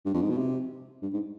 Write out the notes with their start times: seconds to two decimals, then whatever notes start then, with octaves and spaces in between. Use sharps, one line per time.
0.06 G2
0.14 F2
0.22 G#2
0.30 B2
0.38 C3
1.02 G2
1.13 G#2